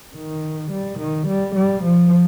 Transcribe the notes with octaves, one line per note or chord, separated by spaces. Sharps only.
D#3
G3
D#3
G3
G3
F3